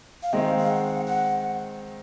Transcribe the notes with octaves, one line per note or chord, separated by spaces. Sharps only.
F5
D#3 G#3 C4 D#5
F5
F5
F#5
F#5